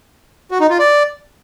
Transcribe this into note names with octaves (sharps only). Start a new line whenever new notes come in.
F#4
D#4
F4
D5